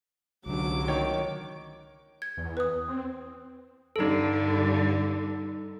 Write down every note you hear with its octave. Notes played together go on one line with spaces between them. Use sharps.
C2 D3 F#3 D6
D#3 C#5
G#6
E2
B4 D#6
C4
G2 D3 D#4 A4